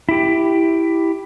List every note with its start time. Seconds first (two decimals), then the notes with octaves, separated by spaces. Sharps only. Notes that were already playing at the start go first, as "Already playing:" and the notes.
0.09 E4 G4